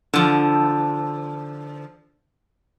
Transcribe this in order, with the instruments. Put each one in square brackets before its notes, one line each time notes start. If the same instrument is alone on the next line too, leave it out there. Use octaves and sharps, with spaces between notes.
[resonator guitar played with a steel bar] D3 F3